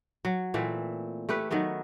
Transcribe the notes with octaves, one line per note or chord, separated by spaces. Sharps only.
F#3
A#2 E3 A3 C4
A3 G4 B4 C#5
D#3 F#3 A3 B3